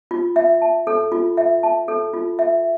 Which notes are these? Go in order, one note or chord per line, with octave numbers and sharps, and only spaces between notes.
F4
E5
A5
A4
F4
E5
A5
A4
F4
E5